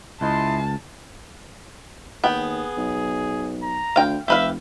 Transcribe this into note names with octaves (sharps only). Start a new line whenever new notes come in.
C#2 E4 D#5 A5 C6
D#2 B3 G#4 G5
B1
A#5
D2 F5 G5
F1 G4 B4 E5 F5